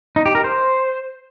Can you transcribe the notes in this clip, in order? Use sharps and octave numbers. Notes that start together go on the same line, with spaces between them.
D#4
G4
A#4
C5